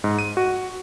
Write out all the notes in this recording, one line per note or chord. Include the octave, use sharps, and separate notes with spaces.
G#2
D#7
F#4